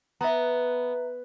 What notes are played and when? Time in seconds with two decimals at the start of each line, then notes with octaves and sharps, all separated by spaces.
0.21 B3 E5 A#5